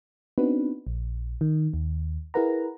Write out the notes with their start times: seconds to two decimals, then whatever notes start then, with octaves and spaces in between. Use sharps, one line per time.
0.38 B3 C4 D4 D#4 F#4 B4
0.87 A#1
1.41 D#3
1.74 D#2
2.34 E4 G#4 A#4 B4 F#5 A#5